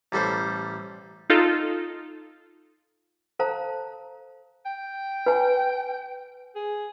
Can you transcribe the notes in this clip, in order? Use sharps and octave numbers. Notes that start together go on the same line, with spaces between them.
A1 G3 A4 C5
D#4 F4 A4
A4 C5 F5 A5 A#5
G5
B4 G#5
G#4